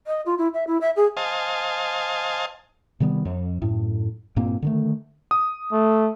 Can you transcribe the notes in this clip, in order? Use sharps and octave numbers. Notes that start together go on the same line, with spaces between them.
D#5
F4
E4
E5
E4
E5
G#4
C5 D#5 F5 G#5 A5
C3 D#3 G3 B3
F2
F#2 A2
G2 A#2 A#3 C4
D3 D#3 A3
D#6
A3